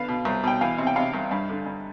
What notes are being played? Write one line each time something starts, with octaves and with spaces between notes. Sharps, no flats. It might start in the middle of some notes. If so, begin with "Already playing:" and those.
Already playing: D3 B3 F5
B2
C2
B2 G5
E3 F5
C3
G5
C3 F5
C2
G2 F5
D3
G2